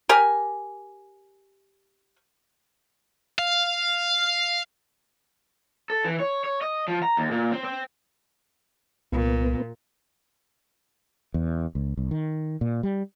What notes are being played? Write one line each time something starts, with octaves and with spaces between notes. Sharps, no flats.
G4 A#4 G#5
F5
A4
E3
C#5
C#5
D#5
F3
A#5
D#2
A#2
C4
C4
C2 A#2 B3
E2
C#2
C2
D#3
A#2
G3